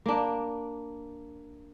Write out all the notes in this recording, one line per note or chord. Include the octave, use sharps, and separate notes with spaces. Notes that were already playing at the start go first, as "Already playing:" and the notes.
A#3 D4